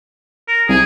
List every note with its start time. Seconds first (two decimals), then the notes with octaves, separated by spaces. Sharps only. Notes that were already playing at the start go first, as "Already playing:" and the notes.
0.48 A#4
0.69 C2 G#4